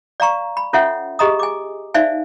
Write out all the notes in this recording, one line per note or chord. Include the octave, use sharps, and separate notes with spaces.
D5 F5 A#5 C#6
B5
C#4 F4 A4 C#5 E5 F#5
G4 G#4 D#5 A#5 D#6
G#5 D6
D#4 C5 D5 E5 F5 G#5